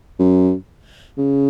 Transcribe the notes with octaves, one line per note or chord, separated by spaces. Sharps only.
F#2
C#3